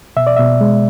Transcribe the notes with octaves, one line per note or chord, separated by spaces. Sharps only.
B2 E5
D5
B2 E5
G#3